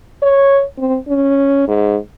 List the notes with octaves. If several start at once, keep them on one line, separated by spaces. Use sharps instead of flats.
C#5
C4
C#4
G#2